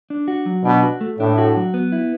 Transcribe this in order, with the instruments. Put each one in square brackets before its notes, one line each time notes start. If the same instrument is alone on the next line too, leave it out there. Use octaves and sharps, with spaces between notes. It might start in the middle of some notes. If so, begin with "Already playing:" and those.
[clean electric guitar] D4
F#4
F#3
[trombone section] B2 [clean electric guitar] D4
[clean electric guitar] F#4
A3
[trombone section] A2 [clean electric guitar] D4
[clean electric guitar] F#4
F#3
B3
E4